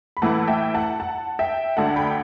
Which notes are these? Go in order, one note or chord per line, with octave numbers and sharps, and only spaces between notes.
B5
A2 E3 A3 E4 F#5 A5
E5 G5
F#5 A5
F#5 A5
E5 G5
D2 D3 A3 F#5 A5
G5 B5